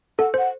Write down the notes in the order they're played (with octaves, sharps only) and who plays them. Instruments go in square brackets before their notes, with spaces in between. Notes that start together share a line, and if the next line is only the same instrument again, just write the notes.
[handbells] A4 [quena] F#5
[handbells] C5 [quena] F#5